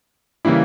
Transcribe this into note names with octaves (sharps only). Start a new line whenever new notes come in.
C#3 E3 G3 A#3 E4